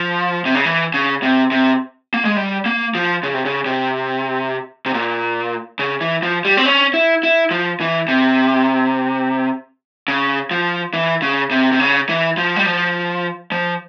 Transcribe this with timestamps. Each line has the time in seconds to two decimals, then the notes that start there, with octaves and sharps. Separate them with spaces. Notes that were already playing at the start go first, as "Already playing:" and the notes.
Already playing: F3
0.46 C3
0.55 C#3
0.65 E3
0.94 C#3
1.23 C3
1.51 C3
2.14 A#3
2.25 G#3
2.36 G3
2.66 A#3
2.95 F3
3.23 C#3
3.34 C3
3.45 C#3
3.66 C3
4.86 C3
4.94 A#2
5.79 C#3
6.01 E3
6.23 F3
6.45 G3
6.57 C4
6.66 C#4
6.94 E4
7.23 E4
7.51 F3
7.80 E3
8.08 C3
10.08 C#3
10.51 F3
10.94 E3
11.22 C#3
11.51 C3
11.72 C3
11.80 C#3
12.09 E3
12.38 F3
12.56 G3
12.66 F3
13.52 F3